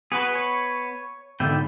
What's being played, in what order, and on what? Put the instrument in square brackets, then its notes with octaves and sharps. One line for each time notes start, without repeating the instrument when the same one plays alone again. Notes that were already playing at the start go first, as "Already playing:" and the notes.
[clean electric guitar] B3 B4 [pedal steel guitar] F#4 G#4
[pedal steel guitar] C#5
[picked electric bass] G#2 D3 D#3 [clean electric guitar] B2 [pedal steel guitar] D5 E5 G5